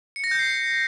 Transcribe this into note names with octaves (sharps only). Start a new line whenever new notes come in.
C#7
A#6
G6
C7